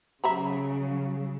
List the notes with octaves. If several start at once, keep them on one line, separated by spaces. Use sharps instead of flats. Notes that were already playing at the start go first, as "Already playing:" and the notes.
C#3 F#3 E5 A#5 B5